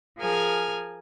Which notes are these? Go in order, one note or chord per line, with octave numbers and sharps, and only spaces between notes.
F3 G#4 A#4 G#5 F6